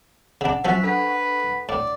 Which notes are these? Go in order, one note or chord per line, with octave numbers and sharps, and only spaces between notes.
C#3 D4 F#5
F3 F#3 C#4 C5 E5 C#6 F#6
D4 A4 B4 F#5
A2 D5